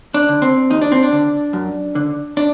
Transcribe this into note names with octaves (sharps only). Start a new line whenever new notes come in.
D4
D3
C4
D#2 D#4
D4
C4
D4
D3
F#2
D3
D4